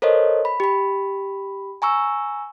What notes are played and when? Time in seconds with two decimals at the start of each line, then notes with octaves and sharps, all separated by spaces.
0.02 A4 A#4 C5 C#5 D#5
0.45 B5
0.60 G4 B5
1.82 G#5 A#5 C#6 E6